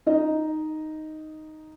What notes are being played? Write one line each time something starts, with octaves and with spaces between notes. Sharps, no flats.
D#4 D#5